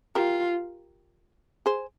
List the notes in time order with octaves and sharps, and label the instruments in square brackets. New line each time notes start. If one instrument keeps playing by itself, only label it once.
[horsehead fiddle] F4 [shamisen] G4 A#4
[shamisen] G#4 C5